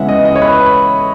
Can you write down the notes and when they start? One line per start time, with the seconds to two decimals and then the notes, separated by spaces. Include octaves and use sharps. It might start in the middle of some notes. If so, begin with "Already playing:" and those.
Already playing: C#3 E3 G#3 B3 E5 F#5
0.09 D#5
0.25 D#5
0.35 C#5
0.42 B4